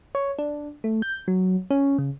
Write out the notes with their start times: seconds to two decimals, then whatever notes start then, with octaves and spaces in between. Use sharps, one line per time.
0.15 C#5
0.39 D4
0.84 A3
1.02 G6
1.28 F#3
1.71 C#4
1.98 C#3